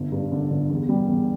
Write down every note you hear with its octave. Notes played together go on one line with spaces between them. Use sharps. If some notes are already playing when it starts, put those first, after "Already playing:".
Already playing: G1
G2
D3
G1
E2
G3
E2